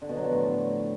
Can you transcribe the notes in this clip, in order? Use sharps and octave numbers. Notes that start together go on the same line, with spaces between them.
D3
B2
F#3
F3
A2